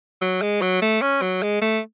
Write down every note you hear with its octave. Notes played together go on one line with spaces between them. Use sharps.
F#3
G#3
F#3
A3
C#4
F#3
G#3
A3